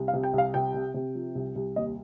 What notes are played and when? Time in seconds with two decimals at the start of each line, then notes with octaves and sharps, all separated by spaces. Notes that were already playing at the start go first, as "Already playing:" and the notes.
Already playing: C2
0.08 F5
0.13 C3
0.23 G5
0.33 C2 F5
0.54 C3 G5
0.74 C3
0.94 C3
1.15 F3
1.35 C2
1.56 C2
1.76 D#2 D#5